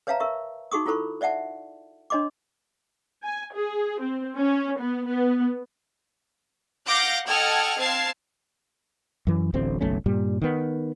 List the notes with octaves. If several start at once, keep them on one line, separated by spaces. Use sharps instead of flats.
B4 C#5 E5 F5 A5 A#5
A#4 E5 C#6
D#4 F#4 G#4 C#6 D#6
E4 F4 A4 C5 B5 C#6
C5 D5 E5 F#5 A5
D4 C#5 D#5 C6 D6
G#5
G#4
C4
C#4
B3
B3
F5 F#5 D6 G6 A#6 D7
A4 D#5 F#5 G5 F6 G#6
C4 F5 A5 G#6 C7
F#2 E3
D1 A1 D2 C4
F#1 B1 A3 C#4
G2 A#2 G3
D#3 B3